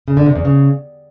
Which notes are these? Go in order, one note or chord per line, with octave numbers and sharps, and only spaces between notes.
C#3
D3
C3
E2
C#3